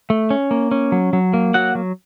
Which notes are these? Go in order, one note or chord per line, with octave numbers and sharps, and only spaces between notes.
A3
C#4
A#3
C#4
F#3
F#3
A#3
F#3 F#4 F#5
F#3